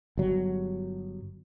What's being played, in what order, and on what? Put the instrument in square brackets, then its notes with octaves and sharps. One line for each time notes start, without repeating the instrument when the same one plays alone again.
[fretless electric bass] G1 F#3